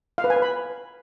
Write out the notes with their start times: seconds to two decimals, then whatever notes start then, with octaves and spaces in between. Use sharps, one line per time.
0.18 F5
0.24 B4
0.30 G#5
0.36 B4
0.42 B5